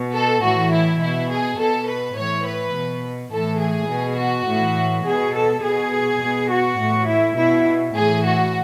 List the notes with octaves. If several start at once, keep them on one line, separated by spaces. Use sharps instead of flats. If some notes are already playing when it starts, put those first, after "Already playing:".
Already playing: B2
A4
A2 E3 F#4
E4
B2 E4
G#4
B2 A4
B4
A2 E3 C#5
B4
B2
A2 E3 A4
G#4
B2
F#4
A2 E3
B2 G#4
A4
B2 G#4
B2
F#4
A2 E3
E4
B2 E4
A2 E3 G#4
F#4